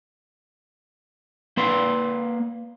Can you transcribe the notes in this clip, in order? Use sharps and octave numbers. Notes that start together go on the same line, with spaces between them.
A#3 B4 C6